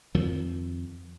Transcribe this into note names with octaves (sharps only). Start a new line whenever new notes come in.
F2 D#3 F3